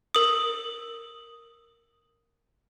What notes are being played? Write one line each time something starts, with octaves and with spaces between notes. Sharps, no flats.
A#4 D#6